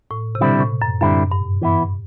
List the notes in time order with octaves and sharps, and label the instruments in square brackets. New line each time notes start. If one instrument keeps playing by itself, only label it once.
[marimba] A2
C3
[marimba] B2 [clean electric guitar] D3 G3 C4 E4
[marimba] A2
F#2
[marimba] F#2 [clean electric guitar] D3 G3 C4 E4
[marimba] G2
[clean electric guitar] E3 B3 E4